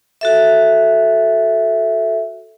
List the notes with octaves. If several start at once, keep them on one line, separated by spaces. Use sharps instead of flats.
F#4 A4 E5